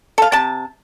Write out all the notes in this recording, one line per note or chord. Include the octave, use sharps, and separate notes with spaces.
A4 F5
C3 A5